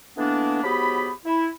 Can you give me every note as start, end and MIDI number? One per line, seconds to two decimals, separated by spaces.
0.18 0.61 50
0.18 0.61 52
0.18 0.61 58
0.18 0.61 59
0.18 0.61 62
0.63 1.10 44
0.63 1.10 54
0.63 1.10 59
0.63 1.10 67
0.63 1.10 83
1.25 1.48 64